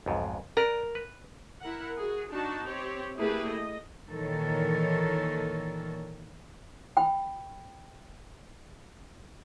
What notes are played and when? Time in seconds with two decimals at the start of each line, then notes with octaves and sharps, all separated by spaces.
0.06 B1 F2 G#2
0.57 A#4 B4 D5
0.95 B4
1.61 E4 A#4 F#5
1.97 F#4 G#4
2.30 D4 D#4 F#4 A5
2.63 C4 G4 C#5
3.17 A3 A#3 E4 G4 G#4 B4
3.47 D#5
4.09 A#2 D#3 E3 A4 A#4 C#5
6.97 G5 B5